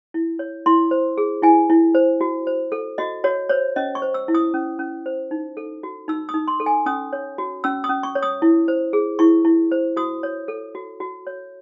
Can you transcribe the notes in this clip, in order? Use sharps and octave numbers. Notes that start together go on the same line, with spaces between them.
E4
C#5
E4 C6
C5
G#4
E4 G#5
E4
C5
F#4
C5
A4
F#4 D#5
F#4 C#5
C5 C#5
C#4 D#5
C#6
C5
E6
E4
D#6
C#4
C#4
C5
D#4
A4
F#4
D#4 E6
D#6
D#4
C6
A4
G#5
C#4 D#6
C#5
F#4
C#4 E6
D#6
C#4
C#6
C#5
D#6
E4
C5
G#4
E4 C#6
E4
C5
F#4 D#6
C#5
A4
F#4
F#4
C#5